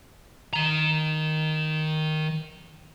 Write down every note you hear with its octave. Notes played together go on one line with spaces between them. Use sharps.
D#3 A#5